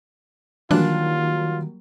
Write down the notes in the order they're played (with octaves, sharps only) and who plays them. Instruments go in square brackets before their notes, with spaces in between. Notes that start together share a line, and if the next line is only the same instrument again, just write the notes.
[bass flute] D#3 [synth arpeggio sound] E3 D4 F#6 [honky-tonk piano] F#3 G3 A#3 [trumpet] F4